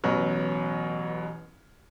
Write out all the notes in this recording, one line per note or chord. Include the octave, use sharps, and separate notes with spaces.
A1 B2 F#3 B4 F6